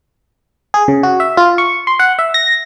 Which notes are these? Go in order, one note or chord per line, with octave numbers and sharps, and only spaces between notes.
G#4
C#3
F#4
E5
F4
C#6
C6
F#5
E5
A#6